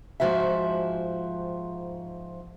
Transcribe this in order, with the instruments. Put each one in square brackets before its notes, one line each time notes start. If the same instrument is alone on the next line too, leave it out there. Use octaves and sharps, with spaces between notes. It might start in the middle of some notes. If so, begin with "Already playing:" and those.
[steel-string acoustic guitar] G#2 D#3 F3 F#4 C5 E5